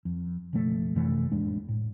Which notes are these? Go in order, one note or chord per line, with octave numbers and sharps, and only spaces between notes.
F2
F#1 B2 F3 A3
F#2 C3 E3 A3
A1 F2 G#3 D4
A2